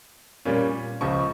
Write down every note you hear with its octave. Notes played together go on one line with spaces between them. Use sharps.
A#2 G3 A#3 C#4 F4
C#2 C#3 F3 C#6